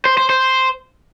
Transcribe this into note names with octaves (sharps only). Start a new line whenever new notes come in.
C5
C5
C5